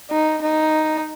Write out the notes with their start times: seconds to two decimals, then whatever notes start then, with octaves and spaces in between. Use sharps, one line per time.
0.11 D#4
0.42 D#4